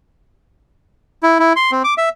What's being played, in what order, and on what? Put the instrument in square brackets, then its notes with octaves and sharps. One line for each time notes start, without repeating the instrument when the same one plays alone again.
[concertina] E4
E4
C6
C4
D6
E5